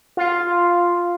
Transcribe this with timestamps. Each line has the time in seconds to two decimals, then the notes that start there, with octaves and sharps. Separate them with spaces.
0.17 F4